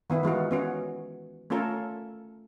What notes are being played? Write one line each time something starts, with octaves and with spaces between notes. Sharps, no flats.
D#3 B3 E4
E3 G#3 F4 F#4
B3 C#4 F#4
A3 C#4 F4 A4 A#4